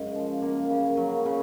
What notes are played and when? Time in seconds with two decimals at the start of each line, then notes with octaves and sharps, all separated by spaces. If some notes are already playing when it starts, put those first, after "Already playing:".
Already playing: F#2 C#3 G#3
0.15 F3
0.42 A#3
0.70 C#3
0.97 F#3
1.26 C#3